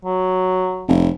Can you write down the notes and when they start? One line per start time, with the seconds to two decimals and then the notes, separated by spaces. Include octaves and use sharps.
0.05 F#3
0.89 F1